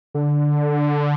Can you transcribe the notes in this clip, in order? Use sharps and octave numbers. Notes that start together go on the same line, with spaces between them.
D3